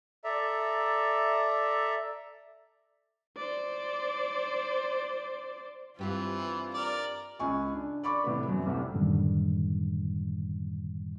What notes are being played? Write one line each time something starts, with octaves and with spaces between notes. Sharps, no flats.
A4 D5 E5 A#5
C5 D5
G2 E3 C4 F4 G4 F5
A#4 D5
C#2 G#5 C#6
D4
D5 B5 C#6 D6
A2 C3 A3 B3
F#2
C2 A2 C3 G3
F#2 A2 D3 D#3 G3